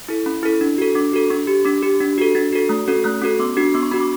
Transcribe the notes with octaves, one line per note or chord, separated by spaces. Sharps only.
E4 A4
C#4 B5
E4 A4
D4
F#4 A4
D4 D6
F#4 A4
D4 C#6
G4
D4 D6
G4
D4
F#4 A4
D4 A6
F#4 A4
A3
C#4 F#4 A4
A3 F#6
C#4 F#4 A4
B3 D6
D4 F#4
B3 D6
C#6
D4 F#4 B5
D6